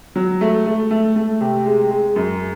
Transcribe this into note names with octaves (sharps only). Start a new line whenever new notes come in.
F#3
A3
A3
A3
A3
C3
G#3
G#3
F#2